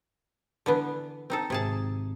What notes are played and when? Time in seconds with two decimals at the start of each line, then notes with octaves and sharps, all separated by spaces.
0.66 D3 E3 B3
1.30 C4 D#4 A4
1.50 G#1 C3 G#4 A5